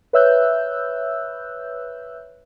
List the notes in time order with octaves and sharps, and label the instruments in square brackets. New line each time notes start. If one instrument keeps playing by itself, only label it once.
[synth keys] B4 C#5 E5 E6 F#6 G6